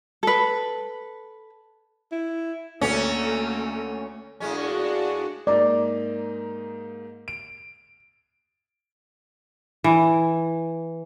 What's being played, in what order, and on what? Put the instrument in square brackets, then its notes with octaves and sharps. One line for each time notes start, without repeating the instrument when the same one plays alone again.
[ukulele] A4 B4
[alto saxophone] E4
[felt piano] D2 [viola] A3 A#3 [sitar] C#4
[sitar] A2 G#3 C#4 [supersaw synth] D4 F#4
[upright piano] G#2 A#3 D#4 [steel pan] D5
[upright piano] D7
[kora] E3